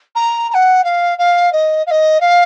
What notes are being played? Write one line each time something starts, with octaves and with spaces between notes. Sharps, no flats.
A#5
A#5
F#5
F5
F5
D#5
F5
D#5
F5